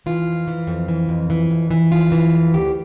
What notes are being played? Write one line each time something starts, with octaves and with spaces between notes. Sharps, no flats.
E3 F4
F2
E3
F2
E3
F2
E3
F2
E3
F2 F4
E3
F2
D2 G4